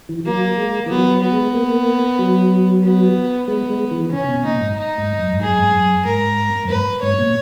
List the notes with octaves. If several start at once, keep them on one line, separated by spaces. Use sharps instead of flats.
E3
F#3 A#3
G#3
E3
F#3 B3
F#3
B3
G#3
A#3
F#3
B3
G#3 B3
G#3
E3
C#3 C#4
B2
B2
A#2 D#4
G#2
D#4
G#2
F#2
G#2
F#2 G#4
G#2
F#2
G#2 A#4
F#2
G#2 B4
G#2 C#5
A#2